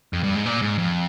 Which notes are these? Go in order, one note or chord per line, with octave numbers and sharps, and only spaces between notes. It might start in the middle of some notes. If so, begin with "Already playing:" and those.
F2
G2
G#2
A#2
G#2
F2